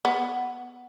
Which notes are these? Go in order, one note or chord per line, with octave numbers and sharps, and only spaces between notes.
B3